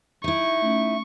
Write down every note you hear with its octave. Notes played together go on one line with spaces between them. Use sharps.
D#4 E4 C#6
A3 C#4